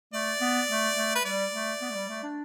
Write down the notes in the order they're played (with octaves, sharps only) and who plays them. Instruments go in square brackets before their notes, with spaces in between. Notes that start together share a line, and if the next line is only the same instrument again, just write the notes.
[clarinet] A3 [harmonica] D5
[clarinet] B3
A3
A3
[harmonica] B4
[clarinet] G3 [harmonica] D5
[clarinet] A3
B3
A3
G3
A3
D4